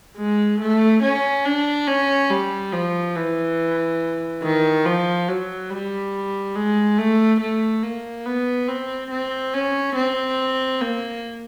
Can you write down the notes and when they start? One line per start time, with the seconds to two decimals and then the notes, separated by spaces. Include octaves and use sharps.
0.17 G#3
0.61 A3
1.03 C#4
1.45 D4
1.87 C#4
2.30 G3
2.73 F3
3.15 E3
4.43 D#3
4.85 F3
5.28 F#3
5.70 G3
6.56 G#3
6.98 A3
7.41 A3
7.83 A#3
8.26 B3
8.68 C4
9.11 C4
9.54 C#4
9.96 C4
10.81 A#3